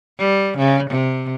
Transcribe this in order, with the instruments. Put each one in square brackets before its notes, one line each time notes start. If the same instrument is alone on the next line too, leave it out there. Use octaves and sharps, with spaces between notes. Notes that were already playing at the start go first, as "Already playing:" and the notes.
[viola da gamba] G3
C#3
C3